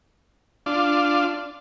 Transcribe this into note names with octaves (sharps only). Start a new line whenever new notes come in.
D4 F4